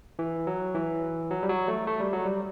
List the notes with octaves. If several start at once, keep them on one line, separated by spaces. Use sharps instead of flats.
E3
F#3
E3
F#3
G3
F#3
A3
A3
G3
F#3
G3